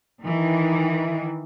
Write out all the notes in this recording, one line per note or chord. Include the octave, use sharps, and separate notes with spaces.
D#3 E3